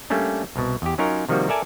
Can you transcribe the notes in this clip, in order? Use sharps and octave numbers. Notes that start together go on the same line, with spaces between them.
G3 A3 A#3 C#4 D4
C2 B2
E2 G4
F#3 C#4 D#4 F4 A#4 C#5
C3 D#3 F3 G3 A#3 F#4
A4 A#4 D5 E5 G#5 A5